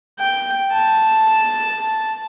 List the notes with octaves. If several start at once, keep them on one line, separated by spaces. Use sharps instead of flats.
G5
A5